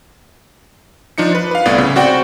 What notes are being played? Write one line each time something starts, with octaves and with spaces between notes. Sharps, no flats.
F3 D4 D#4 C#7
B4
B4 F5
C2 A2 B3 D5
C#3
C4 F#4 D5 F#5 G5